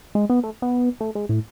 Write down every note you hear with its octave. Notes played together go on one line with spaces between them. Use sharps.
G#3
B3
A3
B3
A3
G#3
A2